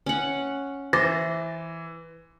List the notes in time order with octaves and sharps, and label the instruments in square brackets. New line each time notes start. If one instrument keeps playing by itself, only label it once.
[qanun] C#4 F#5
[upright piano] E3 [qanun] C5 [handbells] D6 A6 A#6